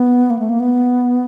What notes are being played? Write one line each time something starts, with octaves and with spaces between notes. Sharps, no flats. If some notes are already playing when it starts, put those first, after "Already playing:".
Already playing: B3
A#3
A3
A#3
B3